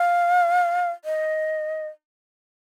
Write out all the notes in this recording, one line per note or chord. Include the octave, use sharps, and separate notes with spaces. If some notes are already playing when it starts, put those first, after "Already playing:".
Already playing: F5
D#5